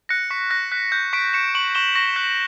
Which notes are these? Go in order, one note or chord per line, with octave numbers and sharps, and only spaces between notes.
F#6 A#6 C#7
C#6 B6
F#6 A#6
F#6 B6
F#6 G6
C#6 B6 D7
C#6 C#7 E7
C#6 D7 F#7
C#6 E7 G7
C#6 A#6
F#6 B6